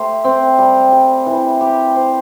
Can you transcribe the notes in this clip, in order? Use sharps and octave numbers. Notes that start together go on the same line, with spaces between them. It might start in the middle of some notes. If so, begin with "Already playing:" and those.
Already playing: A3 G4 C5
C4
G3
G3
E3
G4
C5